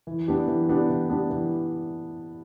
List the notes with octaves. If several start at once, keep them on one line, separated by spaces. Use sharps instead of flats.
E3
B3 D4 G4
E3
B3 D4 G4
E3
B3 D4 G4
E3